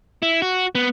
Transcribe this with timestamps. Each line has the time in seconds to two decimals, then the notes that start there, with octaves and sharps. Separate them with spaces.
0.22 E4
0.42 F#4
0.75 B3